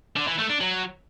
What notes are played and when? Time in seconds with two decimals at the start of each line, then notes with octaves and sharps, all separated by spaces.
0.17 D3
0.28 E3
0.39 A3
0.50 D4
0.61 F#3